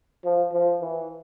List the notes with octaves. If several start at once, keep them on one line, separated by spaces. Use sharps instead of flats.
F3
F3
E3